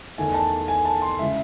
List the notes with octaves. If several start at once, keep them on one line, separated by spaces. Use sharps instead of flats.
E2 D#3 A3 G#5
A5
G#5
A5
C6
C#3 E3 G#3 E5